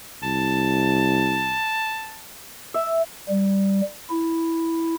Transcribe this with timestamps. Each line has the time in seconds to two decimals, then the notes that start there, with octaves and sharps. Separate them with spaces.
0.23 C2 A5
2.74 E5
3.29 G3
4.10 E4